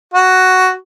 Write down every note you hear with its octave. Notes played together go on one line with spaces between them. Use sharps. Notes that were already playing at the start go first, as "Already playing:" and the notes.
F#4